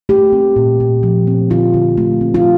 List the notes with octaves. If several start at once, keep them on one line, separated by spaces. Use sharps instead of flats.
A3 G4
C4
A#2
A#2
F3
C4
D3 F4
D3
A3
C4
F4